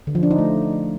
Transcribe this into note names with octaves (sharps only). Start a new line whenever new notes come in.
D3
F3
D4
D#4
A3